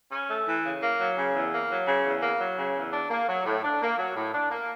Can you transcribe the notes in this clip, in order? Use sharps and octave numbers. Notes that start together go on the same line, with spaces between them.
C#4
A3
E3
C#3
A#3
F#3
C#3
E2
A#3
F#3
C#3
E2
A#3
F#3
C#3
E2
D4
A#3
F#3
A2
D4
A#3
F#3
A2
D4
A#3